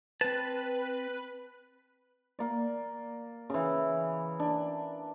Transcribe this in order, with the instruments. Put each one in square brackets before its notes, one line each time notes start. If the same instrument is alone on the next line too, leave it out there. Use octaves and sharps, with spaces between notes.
[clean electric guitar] C4 A5 [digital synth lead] B4
[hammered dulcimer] A#3 D5
C#3 E3
D4